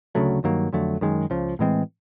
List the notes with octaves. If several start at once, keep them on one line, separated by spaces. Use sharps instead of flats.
D2 C#3 F#3 A3
G2 D#3 F#3 A#3
F2 D3 F#3 A3
F#2 D#3 G#3
C#2 C#3 F3
A2 E3 G#3 C4